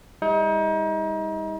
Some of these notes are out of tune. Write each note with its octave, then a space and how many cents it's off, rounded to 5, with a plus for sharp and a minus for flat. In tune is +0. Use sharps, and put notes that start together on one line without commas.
G3 +40 D#4 +35